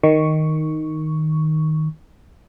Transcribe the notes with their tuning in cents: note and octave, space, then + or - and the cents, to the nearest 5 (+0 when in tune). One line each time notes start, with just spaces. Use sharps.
D#3 +0 C#6 +0